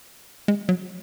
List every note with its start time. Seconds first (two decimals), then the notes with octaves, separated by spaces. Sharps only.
0.48 G#3
0.69 F#3